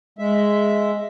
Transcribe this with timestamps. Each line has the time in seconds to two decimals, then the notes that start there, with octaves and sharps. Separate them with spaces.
0.19 G#3 E5